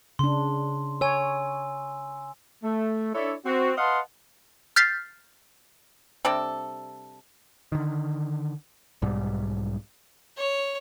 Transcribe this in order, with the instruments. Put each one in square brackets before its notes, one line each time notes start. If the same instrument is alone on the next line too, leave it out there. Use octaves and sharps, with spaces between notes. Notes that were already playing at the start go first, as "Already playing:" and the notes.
[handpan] C#3 D4 [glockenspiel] C6
[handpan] C#5 [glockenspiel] G#5 E6
[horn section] A3
D4 E4 A4 C#5 D5 E5
C4 F#4
B4 D#5 F5 F#5 A5 C6
[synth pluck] F6 G6 A6 B6 C7
[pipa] C3 G3 D4 A4
[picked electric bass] D3 D#3
B1 G#2 G3
[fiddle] C#5